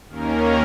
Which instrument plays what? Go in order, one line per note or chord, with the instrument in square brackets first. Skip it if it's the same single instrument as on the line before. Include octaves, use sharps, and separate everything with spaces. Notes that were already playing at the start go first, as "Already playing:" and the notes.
[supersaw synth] D#2 D#3 A#3 C#4 A#4